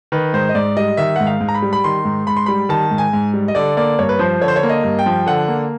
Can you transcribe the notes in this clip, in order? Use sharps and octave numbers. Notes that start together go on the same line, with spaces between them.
D#3 B4
G#2 C5
D#5
G#2 D5
G3 D#5
D#3 E5
G#2 F#5
F5
G#2
A#5
B5
G3
B5
D#3 C6
G#2
G#2 B5
C6
G3 B5
D#3 A5
G#2
G#5
G#2
G3
D#5
D3 D5
A#3 D5
G2 C#5
B4
F3 C5
D3 C#5
C5
C#5
A#3
D#5
G2
G5
F3
D3 F#5
A#3